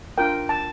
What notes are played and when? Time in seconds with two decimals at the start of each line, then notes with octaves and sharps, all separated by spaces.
0.18 D4 F4 A#4 G5
0.49 A5